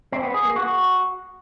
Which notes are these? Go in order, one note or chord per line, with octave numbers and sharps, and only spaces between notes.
C4
B3
G#4
A#3
F#4